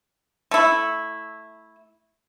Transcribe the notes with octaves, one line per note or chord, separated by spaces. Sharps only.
A3 E4